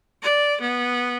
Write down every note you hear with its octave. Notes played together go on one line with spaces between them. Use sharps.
D5
B3